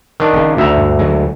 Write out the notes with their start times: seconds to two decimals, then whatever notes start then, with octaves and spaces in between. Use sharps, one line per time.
0.20 D#3 D4
0.34 G#1 C#3
0.57 D2 E5 A#5
0.78 G2
0.99 D3 F#3 G#3